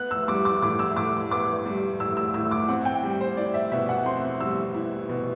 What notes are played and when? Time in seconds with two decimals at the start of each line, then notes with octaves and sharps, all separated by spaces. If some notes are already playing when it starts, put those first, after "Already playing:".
Already playing: B3 F#6
0.11 E6
0.28 G3 D6
0.45 D6
0.62 A2 D6
0.79 E6
0.97 A2 D6
1.31 B3 D6
1.66 G3
2.00 A2 E6
2.17 E6
2.34 A2 E6
2.51 D6
2.68 C4 F#5
2.85 G5
3.03 G3
3.21 C5
3.37 E4 D5
3.54 E5
3.72 B2 E5
3.89 F#5
4.06 C4 C6
4.40 G3 E6
4.74 E4
5.09 B2